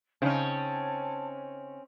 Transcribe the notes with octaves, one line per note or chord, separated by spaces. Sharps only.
C#3 C4 C#4 D#4 A5